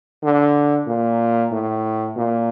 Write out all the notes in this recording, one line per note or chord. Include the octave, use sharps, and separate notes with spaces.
D3
A#2
A2
A#2